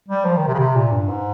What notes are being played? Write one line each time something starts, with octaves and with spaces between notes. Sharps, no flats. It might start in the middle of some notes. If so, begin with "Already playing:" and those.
G3
F3
D#3
C3
C#3
C3
A#2
G2
G#2